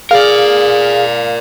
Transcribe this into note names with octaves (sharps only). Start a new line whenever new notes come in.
G#4 A#4 D5 F5